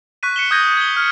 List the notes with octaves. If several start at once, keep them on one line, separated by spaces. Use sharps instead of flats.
C#6 F#6 B6 D#7
C#7 E7 G7
D#6 G6 G#6 A#6 D#7
G#6 G7
F6 C#7